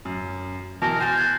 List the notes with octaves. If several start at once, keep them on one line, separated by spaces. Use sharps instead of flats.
F#2
B2 E3 A#4 A5
C5 G#5 A6
F#6 G#6